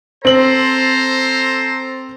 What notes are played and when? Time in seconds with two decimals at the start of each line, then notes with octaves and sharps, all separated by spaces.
0.25 C4 A4 C5 A#5 F#7